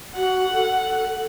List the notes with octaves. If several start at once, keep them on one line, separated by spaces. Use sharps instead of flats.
F#4 F#5
A4